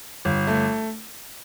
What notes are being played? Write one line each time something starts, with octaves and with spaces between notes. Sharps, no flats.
G1
A3